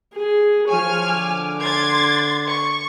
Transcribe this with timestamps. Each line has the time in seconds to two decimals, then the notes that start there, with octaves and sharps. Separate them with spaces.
0.14 G#4
0.69 F3 C#5 G#5 F6
1.10 D3 D6
1.61 C6 G#6 A6
2.49 C#6